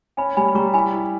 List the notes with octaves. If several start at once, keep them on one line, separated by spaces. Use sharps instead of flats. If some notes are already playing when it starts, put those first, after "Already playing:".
C#4 G#5 B5
G3 G#5 B5
B5
G3 A#5 C#6
E4 G#5 B5
E4